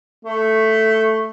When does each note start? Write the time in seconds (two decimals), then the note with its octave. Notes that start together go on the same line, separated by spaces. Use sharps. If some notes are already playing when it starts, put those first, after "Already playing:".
0.25 A3